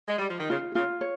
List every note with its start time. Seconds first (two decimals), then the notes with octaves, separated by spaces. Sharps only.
0.08 G#3
0.19 G3
0.30 F3
0.39 D#3
0.50 C#3 F4
0.75 C#3 F4
1.01 C#5